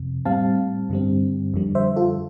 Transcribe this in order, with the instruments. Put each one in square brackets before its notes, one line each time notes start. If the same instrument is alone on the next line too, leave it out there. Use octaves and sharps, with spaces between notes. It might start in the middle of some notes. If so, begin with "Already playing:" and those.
Already playing: [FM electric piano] F2 C3
A2 G3 C4 F5 A5
G2 D3 G3 C4
F2 D3 G3
C5 E5
F4 A4